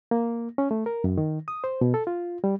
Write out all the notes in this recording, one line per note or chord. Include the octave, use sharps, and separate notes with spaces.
A#3
C#4
A3
A#4
F#2
D#3
D#6
C5
B2
A4
F4
G3